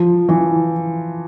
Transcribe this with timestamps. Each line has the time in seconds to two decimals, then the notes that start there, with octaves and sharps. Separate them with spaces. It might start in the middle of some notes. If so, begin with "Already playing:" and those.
Already playing: F3
0.29 E3